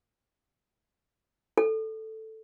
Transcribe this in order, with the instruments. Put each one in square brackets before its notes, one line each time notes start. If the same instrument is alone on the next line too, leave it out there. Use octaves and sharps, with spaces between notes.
[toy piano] A4